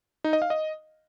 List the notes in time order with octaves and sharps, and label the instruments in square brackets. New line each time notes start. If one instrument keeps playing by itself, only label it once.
[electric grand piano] D#4
D#5
F5
D#5